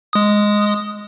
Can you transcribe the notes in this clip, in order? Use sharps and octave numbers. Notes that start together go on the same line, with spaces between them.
G#3 D#6